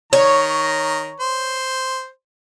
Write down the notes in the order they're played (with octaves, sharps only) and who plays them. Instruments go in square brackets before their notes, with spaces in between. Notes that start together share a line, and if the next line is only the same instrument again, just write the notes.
[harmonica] D#3 A#5 [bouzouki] C#5
[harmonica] C5